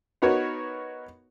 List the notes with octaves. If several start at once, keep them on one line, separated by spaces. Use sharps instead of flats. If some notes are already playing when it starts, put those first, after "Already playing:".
B3 D#4 F#4 A#4 B4 C#5